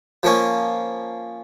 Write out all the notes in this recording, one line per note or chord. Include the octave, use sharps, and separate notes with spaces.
F3 A#3 C#4